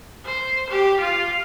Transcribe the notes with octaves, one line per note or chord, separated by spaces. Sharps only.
C5
G4
F4